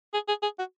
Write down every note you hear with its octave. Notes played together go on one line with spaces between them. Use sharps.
G#4
G#4
G#4
F#4